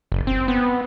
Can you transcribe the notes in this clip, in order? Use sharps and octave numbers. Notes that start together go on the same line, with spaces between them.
F#1
C4
B3